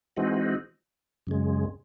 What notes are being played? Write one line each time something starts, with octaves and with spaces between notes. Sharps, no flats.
E3 G#3 C4 D#4 F#4
F#2 C#3 G#3